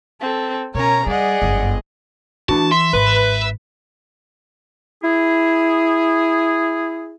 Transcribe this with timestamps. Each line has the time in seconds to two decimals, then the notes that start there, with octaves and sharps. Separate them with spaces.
0.21 C4 A4
0.75 B2 C#4 A#4 C#5 A#5
1.07 G3 G#4 D5 D#5 F#5
1.42 G1 F#2
2.49 E3 D4 F#4 A5
2.72 E5 C6
2.93 G#1 B4
5.03 E4 G#4